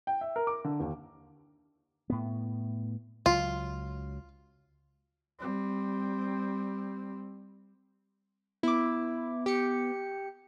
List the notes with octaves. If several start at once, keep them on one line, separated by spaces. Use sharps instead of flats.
G5
E5
A#4
D6
D3
D#2
A2 B3
C#2 F#3 F4
G3 C4
B3 E4 D6
G4 C#7